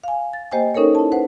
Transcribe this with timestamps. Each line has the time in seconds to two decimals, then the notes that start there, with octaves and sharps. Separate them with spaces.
0.04 F5 G#5
0.33 A6
0.51 A#3 G4 C5 D#5 G5 G#5
0.75 C#4 D#4 A4 A#4 C#5
0.95 E4 A5
1.12 B4 C5 F#5